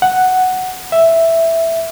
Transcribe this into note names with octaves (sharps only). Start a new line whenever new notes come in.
F#5
E5